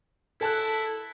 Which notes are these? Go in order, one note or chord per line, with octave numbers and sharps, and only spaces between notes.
E4 A4 A5 F#6